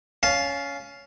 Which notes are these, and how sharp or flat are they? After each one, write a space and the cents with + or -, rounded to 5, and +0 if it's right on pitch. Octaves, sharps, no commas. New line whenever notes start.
C#4 +15 F5 +0 A5 -20